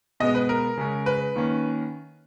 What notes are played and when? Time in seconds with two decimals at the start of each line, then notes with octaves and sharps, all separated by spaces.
0.20 B2 G#3 B3 D#5
0.35 B4
0.49 A#4
0.77 C#3 G#3 C#4
1.06 B4
1.35 D#3 A#3 C#4